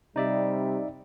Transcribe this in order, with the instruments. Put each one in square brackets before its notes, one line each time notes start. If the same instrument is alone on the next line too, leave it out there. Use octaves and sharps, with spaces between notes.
[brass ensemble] C3 G3 [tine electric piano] D#4 D5 E5